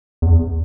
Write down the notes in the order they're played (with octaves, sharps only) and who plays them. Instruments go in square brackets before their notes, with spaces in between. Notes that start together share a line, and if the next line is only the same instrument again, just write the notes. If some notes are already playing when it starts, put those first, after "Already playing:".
[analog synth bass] E2